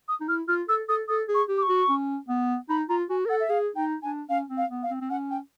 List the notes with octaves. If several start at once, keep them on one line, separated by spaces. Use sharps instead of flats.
D#6
D#4
E4 F6
F4 F6
A4 E6
A4 D#6
A4 D#6
G#4
C#6
G4
D6
C#6
F#4
C#4
B3
D#4 B5
F4 A#5
F#4 G#5
A#4
A4 F#5
E5
G#4 F5
D#4 G5
D4 G#5
C#4 F5
C4
F5
B3
F5
C4
C4
C#4 F#5
G5